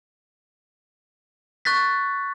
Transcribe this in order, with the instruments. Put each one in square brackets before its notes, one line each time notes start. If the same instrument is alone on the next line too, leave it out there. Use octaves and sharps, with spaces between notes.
[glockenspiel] C#6 F#6 A6 B6